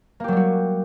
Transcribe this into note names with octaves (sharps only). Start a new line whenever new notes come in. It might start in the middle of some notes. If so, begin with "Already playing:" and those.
F#3 G3 A#3 F#4 G4